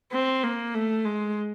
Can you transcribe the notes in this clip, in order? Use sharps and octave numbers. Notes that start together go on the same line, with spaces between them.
C4
A#3
A3
G#3